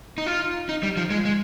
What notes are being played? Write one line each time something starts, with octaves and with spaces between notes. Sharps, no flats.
D#4
F4
D#4
G3
F3
G#3
G#3